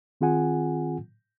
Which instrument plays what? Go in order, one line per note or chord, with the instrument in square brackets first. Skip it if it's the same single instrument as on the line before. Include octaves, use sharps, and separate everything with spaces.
[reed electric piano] D#3 C4 F4 G#4 F#5 G#5